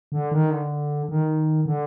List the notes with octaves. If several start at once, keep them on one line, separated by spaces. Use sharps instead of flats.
D3
D#3
D3
D#3
D3